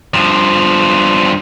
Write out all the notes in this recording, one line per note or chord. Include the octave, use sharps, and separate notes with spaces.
G2 F3